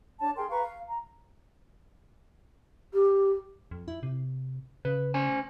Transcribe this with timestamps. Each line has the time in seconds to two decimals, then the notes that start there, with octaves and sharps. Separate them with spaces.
0.19 D4 C#5 A5
0.36 G#4 A#4 G5 C6
0.50 B4 F5 A#5 C#6
0.63 F5
0.88 A#5
2.93 G4
3.71 F2
3.88 E4
4.03 C3
4.85 C#3 B4
5.14 C#4 C5 G#5